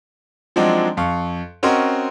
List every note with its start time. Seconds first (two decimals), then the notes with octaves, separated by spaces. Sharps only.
0.56 F3 F#3 G#3 C4 D4 D#4
0.97 F2 F5 C#6
1.63 C4 C#4 F#4 A#4 D#5 C6